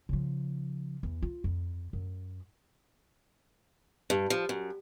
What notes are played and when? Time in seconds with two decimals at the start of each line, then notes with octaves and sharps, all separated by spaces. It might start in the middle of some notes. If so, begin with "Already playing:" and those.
0.09 C#3 F3
1.03 E2
1.22 F4
1.44 F2
1.93 F#2
4.10 G2
4.30 F3
4.49 F#2